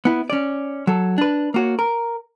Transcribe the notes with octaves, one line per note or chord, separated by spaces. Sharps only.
B3 E4
C#4 D5
F#3 A4
D4 B4
A#3 F#4 C#5
A#4